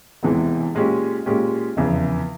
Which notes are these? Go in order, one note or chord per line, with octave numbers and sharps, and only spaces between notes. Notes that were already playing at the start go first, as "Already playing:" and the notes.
E1 E2 C3 E3 G#3
A#2 G#3 C#4 G4
A#2 G#3 C#4 G4
F1 E2 C#3